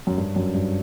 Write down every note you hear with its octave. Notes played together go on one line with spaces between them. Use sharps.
F#2
G2
F#2
G2